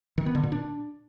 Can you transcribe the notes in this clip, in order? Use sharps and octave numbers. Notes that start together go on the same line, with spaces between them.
D#3
B3
D3
A#2
D4